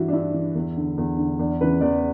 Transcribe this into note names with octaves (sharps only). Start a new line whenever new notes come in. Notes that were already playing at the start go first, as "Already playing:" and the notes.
Already playing: G2 E3 E4 F#4
D4
G2 E4
E3
E2
D3
E2
D3
E2 D4
C#3 E3 B4
E2 D5